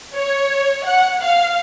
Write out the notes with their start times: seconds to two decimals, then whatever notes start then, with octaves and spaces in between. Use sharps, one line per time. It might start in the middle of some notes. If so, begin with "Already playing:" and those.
0.14 C#5
0.86 F#5
1.22 F5